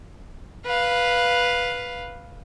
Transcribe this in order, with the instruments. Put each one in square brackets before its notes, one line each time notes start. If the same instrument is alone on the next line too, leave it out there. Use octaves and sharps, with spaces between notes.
[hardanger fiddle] B4 F5